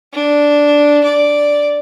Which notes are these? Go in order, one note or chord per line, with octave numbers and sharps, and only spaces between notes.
D4
D5